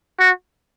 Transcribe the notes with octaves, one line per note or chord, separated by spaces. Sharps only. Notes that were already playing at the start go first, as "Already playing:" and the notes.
F#4